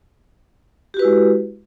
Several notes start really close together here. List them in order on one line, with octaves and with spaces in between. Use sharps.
G4 F#4 B4 E4 G#3